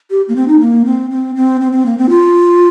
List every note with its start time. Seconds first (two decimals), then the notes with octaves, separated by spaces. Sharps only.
0.11 G4
0.29 A#3
0.36 C4
0.48 D#4
0.60 A#3
0.86 C4
1.11 C4
1.36 C4
1.61 C4
1.72 C4
1.86 A#3
1.98 C4
2.10 F4